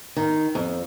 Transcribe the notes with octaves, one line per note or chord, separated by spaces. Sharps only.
D#3
F2